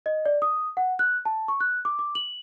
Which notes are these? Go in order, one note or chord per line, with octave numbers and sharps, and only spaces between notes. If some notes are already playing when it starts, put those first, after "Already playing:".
D#5
D5
D#6
F#5
F#6
A5
C#6
F#6
D6
D6
F#7